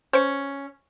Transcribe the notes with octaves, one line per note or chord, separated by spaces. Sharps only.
C#4 C5 C#7